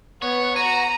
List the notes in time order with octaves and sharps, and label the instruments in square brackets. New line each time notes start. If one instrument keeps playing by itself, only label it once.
[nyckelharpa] B3 [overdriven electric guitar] C#5 [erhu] F#5
[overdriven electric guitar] F#4 [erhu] A#5 [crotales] D#7